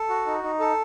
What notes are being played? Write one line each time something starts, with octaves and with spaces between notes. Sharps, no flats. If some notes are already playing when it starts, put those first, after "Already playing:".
Already playing: A4
F#4
D#4
D#4
A4